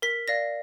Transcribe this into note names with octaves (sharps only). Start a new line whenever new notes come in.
A#4 B6
D5 F5 A#6